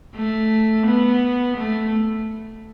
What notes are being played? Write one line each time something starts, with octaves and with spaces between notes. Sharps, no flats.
A3
B3
A3